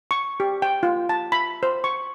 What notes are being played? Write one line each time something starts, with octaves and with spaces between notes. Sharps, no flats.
C#6
G4
G5
F4
A5
B5
C5
C#6